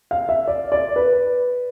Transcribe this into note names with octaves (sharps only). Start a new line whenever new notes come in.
F5
E5
D5
D5
B4